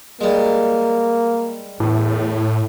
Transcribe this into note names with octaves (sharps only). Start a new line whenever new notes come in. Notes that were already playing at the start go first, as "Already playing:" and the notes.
G3 G#3 A#3
E2 A2